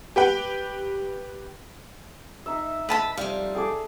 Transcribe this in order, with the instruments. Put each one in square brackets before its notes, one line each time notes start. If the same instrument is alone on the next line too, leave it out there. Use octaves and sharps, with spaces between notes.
[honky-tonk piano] G4 B4 G5
[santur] D#4 E5
[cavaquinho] B4 A5 B5
[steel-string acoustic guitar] F2 C3 G3 [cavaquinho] F5
[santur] G#4 A4 D5